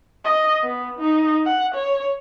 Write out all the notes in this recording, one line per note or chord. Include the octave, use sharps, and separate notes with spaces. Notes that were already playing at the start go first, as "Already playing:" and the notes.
D#5
B3
D#4
F#5
C#5